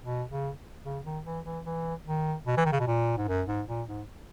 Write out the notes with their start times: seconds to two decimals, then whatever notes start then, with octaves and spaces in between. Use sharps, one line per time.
0.04 B2
0.31 C#3
0.84 C#3
1.05 D#3
1.25 E3
1.45 E3
1.65 E3
2.06 D#3
2.47 B2
2.57 E3
2.65 D#3
2.72 C#3
2.80 B2
2.87 A#2
3.17 G#2
3.28 F#2
3.48 G#2
3.68 A#2
3.88 G#2